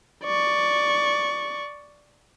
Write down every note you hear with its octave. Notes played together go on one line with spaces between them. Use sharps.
D5 C#6